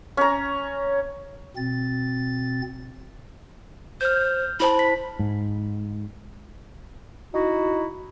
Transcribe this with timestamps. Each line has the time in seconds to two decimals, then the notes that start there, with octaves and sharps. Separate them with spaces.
0.17 C#4 A#5
1.57 B2 C4 A6
4.01 C5 F6 G6
4.60 E4 C5 A5 B5
4.79 B6
5.19 G#2
7.33 D#4 E4 F#4